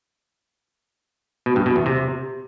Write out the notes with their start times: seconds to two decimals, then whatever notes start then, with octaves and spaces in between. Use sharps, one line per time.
1.46 B2
1.56 G2
1.66 B2
1.76 E2
1.86 C3